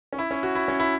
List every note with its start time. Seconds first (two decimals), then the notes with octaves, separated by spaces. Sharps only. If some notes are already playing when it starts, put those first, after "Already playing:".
0.13 C#4
0.18 E4
0.31 C#4
0.43 F#4
0.55 E4
0.68 C#4
0.80 E4